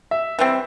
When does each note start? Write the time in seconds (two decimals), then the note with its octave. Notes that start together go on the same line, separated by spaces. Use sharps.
0.11 E5
0.39 E3 G3 C4 E5